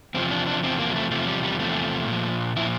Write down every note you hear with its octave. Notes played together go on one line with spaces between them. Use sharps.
E2 C3 F3 C4
D4
D4
E2 C3 F3 C4
A#3
G3
A3
E2 C3 F3 A3
G3
G3
E2 C3 F3 A3
A#2 F3
A#2 F3 E4